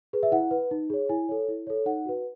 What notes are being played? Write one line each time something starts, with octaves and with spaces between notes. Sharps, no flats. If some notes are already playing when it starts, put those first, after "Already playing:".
G#4 B4
E5
E4 F#5
B4
D#4
G#4 C#5
E4 G#5
A4 C#5
E4
A4 C#5
D#4 F#5
F#4 B4